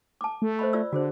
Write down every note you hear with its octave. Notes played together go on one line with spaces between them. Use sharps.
A5 D6
A3
C5 D#5 B5
F4 D5 E6
D3 F#4 G#4 C5